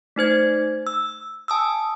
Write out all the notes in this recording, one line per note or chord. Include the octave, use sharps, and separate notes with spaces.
A3 D#4 C5 G#6
E6
G#5 A5 D#6 E6